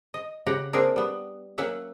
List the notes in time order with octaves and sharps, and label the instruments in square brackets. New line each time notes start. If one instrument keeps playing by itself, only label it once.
[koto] D#5
C#3 G4 F#5 A#5
A#3 C4 D4 G#4 A#4
G3 B3
F#3 A#3 C#4 E5 F#5